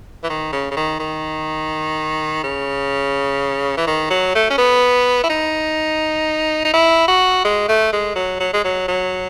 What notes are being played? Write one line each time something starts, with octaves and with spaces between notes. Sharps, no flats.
E3
D#3
C#3
C#3
D#3
D#3
C#3
E3
D#3
F#3
A3
C#4
B3
E4
D#4
D#4
E4
F#4
G#3
A3
G#3
F#3
F#3
G#3
F#3
F#3